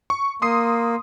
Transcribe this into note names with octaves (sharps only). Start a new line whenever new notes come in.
C#6
A#3 C6 D#6 C7